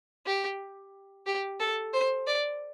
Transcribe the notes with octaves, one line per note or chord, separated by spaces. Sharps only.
G4
G4
A4
C5
D5